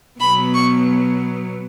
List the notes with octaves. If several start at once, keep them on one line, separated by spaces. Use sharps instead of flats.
B2 F#3 B3 B5
C#6